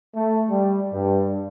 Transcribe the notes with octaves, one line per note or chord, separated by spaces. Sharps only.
A3
G3
G2